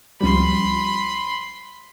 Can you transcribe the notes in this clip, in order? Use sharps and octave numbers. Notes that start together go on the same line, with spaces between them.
C#2 F3 G3 B5 C6